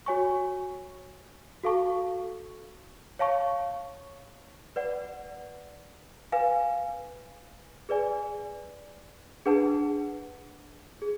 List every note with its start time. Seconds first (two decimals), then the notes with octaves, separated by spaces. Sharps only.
0.06 F#4 C#5 G#5 C#6
1.63 F#4 A4 F5 A5 C#6
3.19 C#5 F5 A5 C#6
4.76 B4 D5 F#5
6.32 B4 F5 G#5
7.89 G#4 B4 D5 G#5
9.46 D4 G#4 B4 F#5 A5
11.02 G#4